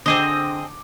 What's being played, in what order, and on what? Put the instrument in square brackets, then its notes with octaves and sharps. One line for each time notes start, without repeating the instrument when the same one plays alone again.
[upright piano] D3 D6 [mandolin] C4 G#4 D#5